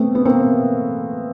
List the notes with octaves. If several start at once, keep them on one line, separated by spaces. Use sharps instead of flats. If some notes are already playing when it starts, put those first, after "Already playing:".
Already playing: A3 B3 C4
B3
A#3 C4